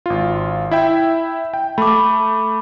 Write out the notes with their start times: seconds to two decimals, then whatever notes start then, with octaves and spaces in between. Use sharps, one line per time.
0.06 G#1 F4
0.71 E4 E5 G5
1.54 G5
1.78 A3 B5 D6